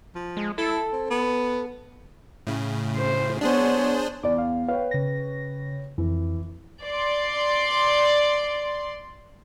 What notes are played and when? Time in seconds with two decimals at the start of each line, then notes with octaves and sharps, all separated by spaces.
0.15 F3
0.37 G#3
0.58 E4 A4
0.93 C4
1.10 B3
2.47 A2 C#3
2.96 C5
3.41 B3 D4 G#4 C5 C#5
4.23 E2 D5 D6
4.38 F5
4.68 B4 C#5 F5 G5
4.91 C#3 A#6
5.98 F2 E3
6.84 D5 C6